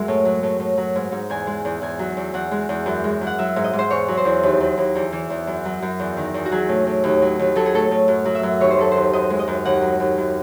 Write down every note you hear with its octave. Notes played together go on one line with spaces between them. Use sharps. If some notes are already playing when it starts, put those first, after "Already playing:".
Already playing: F#2 G#3 E5
A2
F#3
A2
A2
F#3
G#2
G#2
E2 G#5
G#3
E2
E2 G#5
F#3
E2
E2 F#5
G#3
E2
F#2
G#3
F#2
F#5
F#3 E5
G#2
D#5
G#2
C5
E2 C#5
F#3
C5
E2
D#2
F#3
D#2
E2
E3
E2
F#2
F#3
F#2
E2
D#3
E2
F#4
F#3 G#4
A2
A2
D#2
F#3
D#2
F#3 A4
G#4
A2 A4
A2
F#2
F#3
E5
F#2
D#2 C#5
C5
F#3 A4
D#2 C5
F#2 D#5
G#3
D#5
F#2
D#2 F#5
F#3
D#2
F#2